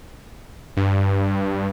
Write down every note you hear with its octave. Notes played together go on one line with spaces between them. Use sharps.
G2